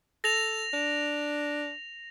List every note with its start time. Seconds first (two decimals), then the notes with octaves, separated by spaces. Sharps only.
0.24 A4 A#6 F7
0.74 D4